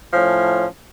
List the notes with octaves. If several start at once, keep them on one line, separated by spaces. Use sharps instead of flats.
A2 F3 C#4